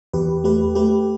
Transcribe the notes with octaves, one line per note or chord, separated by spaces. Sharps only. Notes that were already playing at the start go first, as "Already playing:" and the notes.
E2 G4 B4
A3 G4 B4
A3 G4 B4